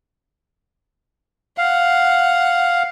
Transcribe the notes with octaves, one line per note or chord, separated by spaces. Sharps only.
F5 F#5